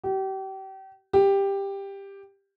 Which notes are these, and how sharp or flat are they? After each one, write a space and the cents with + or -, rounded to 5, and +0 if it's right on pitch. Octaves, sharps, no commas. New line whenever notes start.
G4 -35
G4 +10